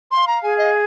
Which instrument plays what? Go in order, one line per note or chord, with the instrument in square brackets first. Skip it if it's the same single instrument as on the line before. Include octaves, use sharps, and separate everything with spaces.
[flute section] F5 [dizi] C6
[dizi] A#5
[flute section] G#4 [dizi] G#5
[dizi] D#5